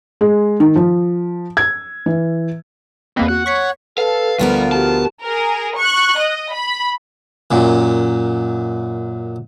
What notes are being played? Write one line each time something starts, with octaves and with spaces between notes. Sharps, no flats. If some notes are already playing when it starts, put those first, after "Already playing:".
G#3
D#3
F3
G#6
E3
E2 A#3 C4 B4 D#5
F#4 F#5
C#5 C#6 B6 C#7
A4 B4 F5
D2 F3 G3 B3 F4 A#4
F#4 G4 A5
G#4 A#4
C#6 F#6
D#5
B5
F#2 A#2